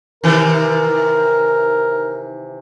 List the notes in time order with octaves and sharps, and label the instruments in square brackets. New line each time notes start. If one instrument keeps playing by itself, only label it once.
[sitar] C3 D#3 E3 [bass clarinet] A#4